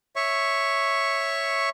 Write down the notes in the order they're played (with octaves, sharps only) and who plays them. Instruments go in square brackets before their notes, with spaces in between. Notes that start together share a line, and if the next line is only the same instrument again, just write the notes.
[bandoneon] C#5 E5 C#6